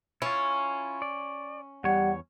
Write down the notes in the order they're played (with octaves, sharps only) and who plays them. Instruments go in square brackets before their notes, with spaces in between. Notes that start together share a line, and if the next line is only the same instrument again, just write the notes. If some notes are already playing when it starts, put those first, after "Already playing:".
[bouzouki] C#4 [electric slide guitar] E4 F4
[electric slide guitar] D5
[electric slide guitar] E2 C#5 [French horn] G3 [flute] F#5